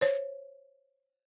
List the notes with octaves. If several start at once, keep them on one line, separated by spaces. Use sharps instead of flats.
C5 C#5